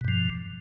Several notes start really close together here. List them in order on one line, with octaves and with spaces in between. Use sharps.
B2 G2 F3